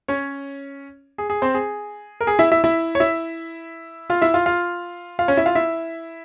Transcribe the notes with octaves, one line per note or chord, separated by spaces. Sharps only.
C#4 C#5
G#4
G#4
C4 C5
G#4
A#4
G#4
E4 E5
E4 E5
E4 E5
C#5
E4 E5
F4 F5
E4 E5
F4 F5
F4 F5
F4 F5
C#4 C#5
E4 E5
F4 F5
E4 E5